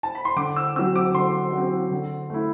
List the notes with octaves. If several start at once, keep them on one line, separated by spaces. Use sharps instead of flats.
A5
B5
C6
D3 D6
E6
F#3 C4 E6
D6
D3 C6
F#3 C4
D3
A3 E4